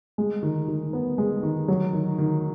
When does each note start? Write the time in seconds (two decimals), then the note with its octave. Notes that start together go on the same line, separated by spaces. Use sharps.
0.18 G#3
0.43 D#3
0.68 D#3
0.93 B3
1.18 G#3
1.43 D#3
1.68 F#3
1.93 D#3
2.18 D#3